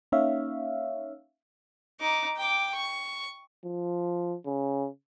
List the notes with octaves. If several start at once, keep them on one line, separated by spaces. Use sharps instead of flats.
A#3 C#4 D#4 C#5 E5 F5
D#4 D6
G5 D6
C#6
F3
C#3